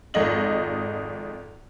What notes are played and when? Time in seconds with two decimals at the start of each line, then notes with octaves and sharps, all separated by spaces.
0.14 G#1 F2 D#5 F#7